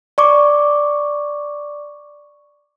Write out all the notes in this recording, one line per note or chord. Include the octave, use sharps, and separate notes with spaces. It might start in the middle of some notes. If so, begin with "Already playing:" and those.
D5 C#6 D6